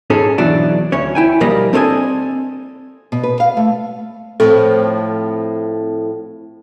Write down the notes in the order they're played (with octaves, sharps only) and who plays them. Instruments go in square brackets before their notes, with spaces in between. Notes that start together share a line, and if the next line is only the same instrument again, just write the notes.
[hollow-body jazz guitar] G#2 C#4 G#4 A4
B1 B2 E3 F#3 D4
D2 C#4 C#5
E4 G5 G#5
D2 B2 F3 G3 A#3 D#5
C4 D4 A4 C#5 D#5 G#5
[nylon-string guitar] B2
B4
F5
A3
[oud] A2 F3 [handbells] C4 [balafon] A4